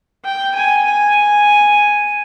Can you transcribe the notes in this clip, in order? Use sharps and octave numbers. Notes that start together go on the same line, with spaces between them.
G5
G#5
G#5